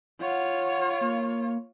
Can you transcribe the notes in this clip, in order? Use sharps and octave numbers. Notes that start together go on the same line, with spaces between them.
F4 C#5 F#5
A#3